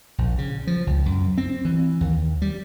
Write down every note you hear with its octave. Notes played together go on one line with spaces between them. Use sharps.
A#1
C#3
F3
C#2
F#2
C4
E3
D#2
G3